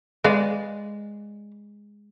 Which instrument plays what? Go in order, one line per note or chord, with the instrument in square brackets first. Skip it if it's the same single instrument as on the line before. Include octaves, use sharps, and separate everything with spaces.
[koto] G#3 [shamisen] B4 D5 F5